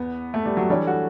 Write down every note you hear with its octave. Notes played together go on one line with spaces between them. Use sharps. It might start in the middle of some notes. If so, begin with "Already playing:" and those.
Already playing: E2 B3
A3
G3
F#3
E3 G3 A3 D4 A4 C#5
F#4